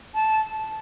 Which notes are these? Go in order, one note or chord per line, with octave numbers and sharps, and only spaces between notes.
A5